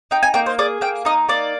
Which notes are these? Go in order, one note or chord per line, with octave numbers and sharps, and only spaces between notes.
D#4 G5
G#5
A#3 G5
C5
G#4 D5
A#3 G5
D#4 D#5
A#3 D5